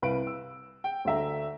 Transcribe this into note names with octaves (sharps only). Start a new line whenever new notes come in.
C2 B4 F5 D7
E6
G5
D2 D3 E5 A#5